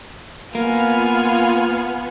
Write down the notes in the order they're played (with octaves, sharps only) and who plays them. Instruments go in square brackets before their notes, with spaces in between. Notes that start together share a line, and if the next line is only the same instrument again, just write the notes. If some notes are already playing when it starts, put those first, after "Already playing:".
[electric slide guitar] A#3 [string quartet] B3 [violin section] F4 G#5 F6